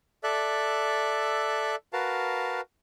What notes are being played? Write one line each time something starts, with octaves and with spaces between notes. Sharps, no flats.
A4 D5 E5 F#6
F#4 A#4 B4 F5 A5